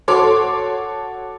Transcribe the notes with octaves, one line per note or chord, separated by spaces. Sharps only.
F#4 A4 C#5 C6 D6